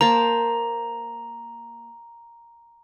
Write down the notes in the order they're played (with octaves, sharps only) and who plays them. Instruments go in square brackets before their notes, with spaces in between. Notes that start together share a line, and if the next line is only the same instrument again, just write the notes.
[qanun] A#3 C5 A5 [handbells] A#5